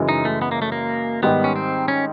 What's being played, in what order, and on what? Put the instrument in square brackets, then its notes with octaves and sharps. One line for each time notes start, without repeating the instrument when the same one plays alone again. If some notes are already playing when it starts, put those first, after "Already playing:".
Already playing: [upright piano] F#2 C#3 E3 G#3
[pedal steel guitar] D#4
A3
B3
A#3
A3
A#3
[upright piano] G#2 D#3 G3 [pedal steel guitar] B3
[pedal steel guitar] C#4
C4
C#4